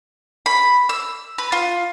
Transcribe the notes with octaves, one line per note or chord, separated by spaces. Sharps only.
B5
E6
B4
F4